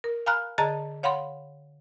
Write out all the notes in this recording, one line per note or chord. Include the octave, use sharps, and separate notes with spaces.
A#4
F5 G#5 A#5 B5 F6 F#6
D3 G#4 D#5 A5 A#5 A6
C#5 F5 F#5 B5 C6